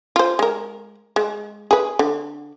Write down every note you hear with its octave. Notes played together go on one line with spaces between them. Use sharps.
F4 C5
G#3 A#4
G#3
G#4 B4
D3